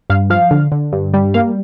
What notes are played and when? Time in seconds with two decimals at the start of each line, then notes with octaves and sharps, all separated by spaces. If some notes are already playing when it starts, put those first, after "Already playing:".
0.10 G2 F5
0.30 F3 F5
0.51 D3
0.72 D3
0.93 G2
1.14 G3
1.34 A#3 F5